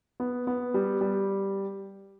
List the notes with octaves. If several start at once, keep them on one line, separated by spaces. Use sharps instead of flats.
B3
B3
G3
G3